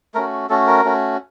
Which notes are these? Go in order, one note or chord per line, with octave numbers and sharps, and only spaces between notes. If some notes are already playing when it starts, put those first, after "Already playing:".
A3 C#4 F#4 A#4
A3 C#4 F#4 A4
A#4
A3 C#4 F#4